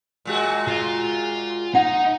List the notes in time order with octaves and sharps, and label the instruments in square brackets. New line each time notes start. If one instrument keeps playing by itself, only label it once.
[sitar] A#2 G#3 F#4
[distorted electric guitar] F4
[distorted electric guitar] D#4 [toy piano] F#5